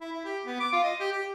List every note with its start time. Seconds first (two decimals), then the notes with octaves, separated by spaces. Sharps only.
0.01 E4
0.12 E4
0.25 G4
0.45 B3
0.60 D6
0.73 F4
0.84 D#5
1.00 G4
1.12 G4